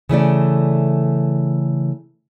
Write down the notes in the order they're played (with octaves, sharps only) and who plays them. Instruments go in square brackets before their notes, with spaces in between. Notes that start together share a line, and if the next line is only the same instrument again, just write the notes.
[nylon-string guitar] C#3 E3 A3 D5